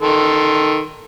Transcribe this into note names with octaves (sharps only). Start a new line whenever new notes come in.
D#3 A4 C6